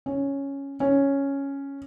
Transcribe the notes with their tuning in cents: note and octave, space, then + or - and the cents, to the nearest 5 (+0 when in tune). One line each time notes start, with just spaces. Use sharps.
C#4 +0
C#4 +0